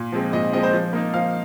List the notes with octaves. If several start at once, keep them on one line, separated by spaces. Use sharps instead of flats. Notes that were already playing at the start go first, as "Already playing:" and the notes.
Already playing: A#2
F3 G#3 C4
A#2 D#5
F3 G#3 C4 D#5
C5
F3
A#3 D#4
F3 F5